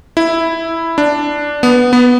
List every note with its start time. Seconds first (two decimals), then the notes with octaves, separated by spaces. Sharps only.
0.17 E4
0.98 D4
1.63 B3
1.93 B3